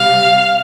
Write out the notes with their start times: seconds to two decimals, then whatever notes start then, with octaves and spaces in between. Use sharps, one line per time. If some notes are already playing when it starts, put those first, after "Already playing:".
Already playing: C3 G3 F5